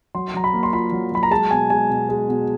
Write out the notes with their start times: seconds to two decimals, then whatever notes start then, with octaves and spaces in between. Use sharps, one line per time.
0.15 F#3 C6
0.34 F#3 A#5
0.44 B5
0.54 A#3
0.63 C6
0.73 F4 B5
0.92 F#3
1.12 F#3 B5
1.23 A#5
1.31 G#3 A5
1.51 B2 G#5
1.70 G#3 G#5
1.89 B2
2.09 G#3
2.28 B2